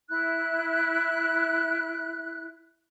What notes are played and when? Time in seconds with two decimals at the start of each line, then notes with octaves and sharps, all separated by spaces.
0.09 E4 F#6